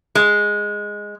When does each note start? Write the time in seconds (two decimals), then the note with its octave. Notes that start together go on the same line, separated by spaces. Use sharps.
0.15 G#3